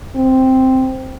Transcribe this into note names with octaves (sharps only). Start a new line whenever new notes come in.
C4